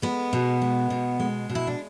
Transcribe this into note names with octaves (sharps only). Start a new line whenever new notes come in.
G#3 B3
B2
G#3
B2
G#3
B2
E4
D4